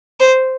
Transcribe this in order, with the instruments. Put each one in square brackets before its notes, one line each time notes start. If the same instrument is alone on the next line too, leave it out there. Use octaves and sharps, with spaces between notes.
[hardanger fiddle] C5